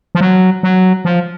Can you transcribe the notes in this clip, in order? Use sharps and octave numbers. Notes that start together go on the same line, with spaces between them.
F3
F#3
F#3
F3